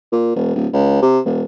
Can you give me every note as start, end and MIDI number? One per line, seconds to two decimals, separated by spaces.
0.12 0.35 46
0.36 0.55 28
0.55 0.67 26
0.73 1.01 37
1.02 1.19 48
1.25 1.43 28